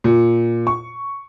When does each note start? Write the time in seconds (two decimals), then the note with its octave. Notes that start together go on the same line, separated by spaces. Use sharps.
0.04 A#2
0.67 C#6